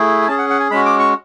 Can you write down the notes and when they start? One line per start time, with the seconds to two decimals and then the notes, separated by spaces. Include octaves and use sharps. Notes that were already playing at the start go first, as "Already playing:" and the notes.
Already playing: A3 E4 G#4
0.22 G#5
0.28 C#4 G#4 A5
0.38 F#5
0.50 F#5
0.60 G#5
0.71 G#3 C#4 F#4 B5
0.86 D6
0.99 C#6